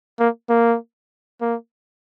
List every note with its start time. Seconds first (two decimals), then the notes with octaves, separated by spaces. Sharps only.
0.20 A#3
0.49 A#3
1.41 A#3